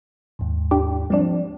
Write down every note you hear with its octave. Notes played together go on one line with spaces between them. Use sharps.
D#2 G#2
D4 G4
F3 G3 C4 D4